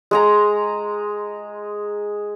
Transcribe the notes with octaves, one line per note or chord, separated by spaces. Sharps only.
G#3 G#4 A#5